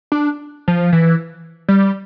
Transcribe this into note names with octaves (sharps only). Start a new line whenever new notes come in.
D4
F3
E3
G3